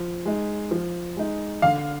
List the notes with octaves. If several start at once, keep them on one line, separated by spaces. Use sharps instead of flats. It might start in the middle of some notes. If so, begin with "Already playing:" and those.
Already playing: F3
G#3 D#4
F3
G#3 D#4
D3 F5